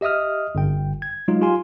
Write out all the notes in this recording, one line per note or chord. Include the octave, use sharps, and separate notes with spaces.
G4 D#5 E5 D#6 F6
G1 G5
G#6
F#3 G#3 D#4 F4
F4 G4 G#5 C6